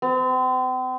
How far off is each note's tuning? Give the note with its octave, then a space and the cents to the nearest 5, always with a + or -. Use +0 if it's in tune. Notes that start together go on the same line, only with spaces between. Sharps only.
C4 -40